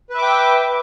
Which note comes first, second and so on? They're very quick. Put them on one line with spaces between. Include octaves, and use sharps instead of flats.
B4 E5 D6 G5